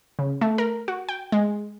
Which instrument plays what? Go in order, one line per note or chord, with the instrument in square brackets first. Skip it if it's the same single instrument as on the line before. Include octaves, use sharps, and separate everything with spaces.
[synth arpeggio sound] C#3
A3
A#4
F#4
G5
G#3